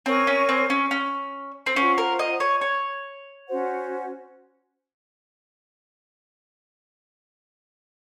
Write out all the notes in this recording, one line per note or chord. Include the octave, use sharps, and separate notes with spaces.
C4 A#4 C#5 G#5 C#6
C#4
C4
C#4
C#4
C4
C#4 F4 C5 F#5
A#4
D#5
C#5
C#5
C#4 F#4 C5 F#5